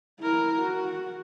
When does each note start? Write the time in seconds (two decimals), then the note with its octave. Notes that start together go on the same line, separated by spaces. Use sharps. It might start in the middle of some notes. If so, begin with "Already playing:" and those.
0.20 E4 A#4
0.60 F#4